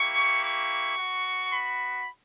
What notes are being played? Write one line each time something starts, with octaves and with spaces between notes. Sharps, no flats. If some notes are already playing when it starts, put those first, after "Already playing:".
Already playing: A#3 E4 G4 C#6
C#6
B3 F#4
B5